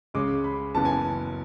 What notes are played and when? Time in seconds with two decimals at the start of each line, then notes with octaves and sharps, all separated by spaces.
0.14 C#2 C#3 G#3 C#4 D6
0.44 B5
0.75 F#1 F#2 E3 B3 A5
0.85 G#5